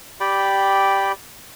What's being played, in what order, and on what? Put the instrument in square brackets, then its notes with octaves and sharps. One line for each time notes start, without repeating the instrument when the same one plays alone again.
[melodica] G4 D5 G5 B5